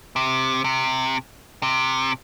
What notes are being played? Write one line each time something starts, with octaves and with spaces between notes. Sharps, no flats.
C3
C3
C3